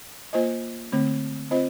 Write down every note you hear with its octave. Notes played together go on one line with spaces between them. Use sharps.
A#3 F4 C5 D#5
D3 A3 C4
C4 F4 C5 D#5